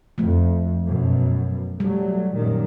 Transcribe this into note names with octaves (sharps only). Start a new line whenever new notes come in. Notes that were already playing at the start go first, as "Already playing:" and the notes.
F2 F3 A3
F#2 B2
F#3 G3 A3
F#2 A#2 D#3